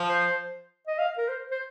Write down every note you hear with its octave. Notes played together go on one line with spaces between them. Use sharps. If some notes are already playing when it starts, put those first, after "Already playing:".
Already playing: F3
C5
D#5
F5
A#4
C5
C5